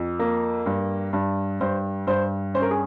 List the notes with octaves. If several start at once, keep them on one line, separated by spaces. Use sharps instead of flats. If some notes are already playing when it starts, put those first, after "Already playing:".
Already playing: F2
A#3
G2
G2
G2 C5
G2 C5
C#4 C5
A#4
G#4